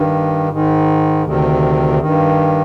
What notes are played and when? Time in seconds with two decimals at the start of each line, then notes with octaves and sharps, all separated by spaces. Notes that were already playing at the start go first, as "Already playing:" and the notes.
Already playing: G2 D#3
0.50 G#2 D#3
1.24 D2 C3 D#3
1.99 G2 D#3